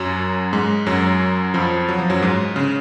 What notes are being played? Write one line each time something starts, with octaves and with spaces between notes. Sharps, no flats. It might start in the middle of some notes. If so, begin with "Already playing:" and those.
Already playing: F#2 F#3
G#2 G#3
F#2 F#3
F2 F3
F#3
F3
F#2 F#3
G#2 G#3
C#3